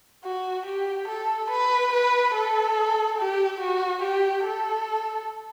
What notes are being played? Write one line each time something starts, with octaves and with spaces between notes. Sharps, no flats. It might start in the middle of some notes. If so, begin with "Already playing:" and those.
F#4
G4
A4
B4
B4
A4
G4
F#4
G4
A4